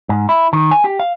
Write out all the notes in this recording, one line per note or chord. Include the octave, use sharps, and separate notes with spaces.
G#2
E4
D#3
G#5
G4
F5